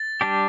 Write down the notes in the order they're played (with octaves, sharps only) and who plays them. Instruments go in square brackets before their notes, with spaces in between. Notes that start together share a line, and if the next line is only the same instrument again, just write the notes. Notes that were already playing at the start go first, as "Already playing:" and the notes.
Already playing: [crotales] A6
[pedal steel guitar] G3 D4 G4